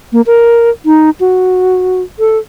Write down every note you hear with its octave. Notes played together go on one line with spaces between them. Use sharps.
A#3
A#4
D#4
F#4
A4